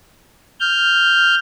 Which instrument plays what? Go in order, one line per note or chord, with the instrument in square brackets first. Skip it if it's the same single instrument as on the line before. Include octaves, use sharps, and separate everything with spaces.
[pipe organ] F6 G6